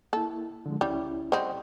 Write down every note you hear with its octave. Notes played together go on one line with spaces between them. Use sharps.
A#3 E4 A4
D3 F3 G#3
C#2 G3 C#4 E4
G3 C4 C5 D#5 F#5